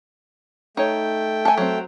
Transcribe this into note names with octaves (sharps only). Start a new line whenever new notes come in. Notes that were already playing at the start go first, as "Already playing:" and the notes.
A3 D#4 C#5 G5
A4 G#5
F#3 C4